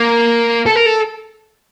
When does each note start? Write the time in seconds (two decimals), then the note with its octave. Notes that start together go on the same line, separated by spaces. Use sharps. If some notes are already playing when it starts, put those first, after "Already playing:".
Already playing: A#3
0.66 A4
0.75 A#4
0.86 A4